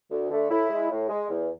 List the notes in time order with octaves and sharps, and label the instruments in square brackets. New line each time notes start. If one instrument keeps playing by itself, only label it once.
[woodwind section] D2
D3 A3
A2 E4
G#3
A2
G#3
E2